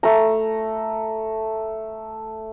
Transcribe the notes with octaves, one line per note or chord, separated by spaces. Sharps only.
A3 A#5